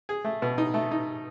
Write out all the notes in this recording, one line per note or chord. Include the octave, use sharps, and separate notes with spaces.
G#4
A3
B2
D#4
A3
D#4